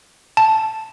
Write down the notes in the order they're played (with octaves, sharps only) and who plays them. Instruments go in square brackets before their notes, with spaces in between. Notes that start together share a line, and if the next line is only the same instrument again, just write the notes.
[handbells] A5